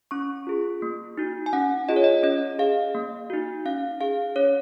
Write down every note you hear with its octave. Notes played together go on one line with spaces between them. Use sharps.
C#4 C#6
F4 G#4
A#3
D#4 F#4
G#5
C#4 F#5
F4 G#4 D#5
C#5
D#5
C#4 D#5
G#4 F5
A#3
D#4 F#4
C#4 F5
G#4 F5
C#4 C#5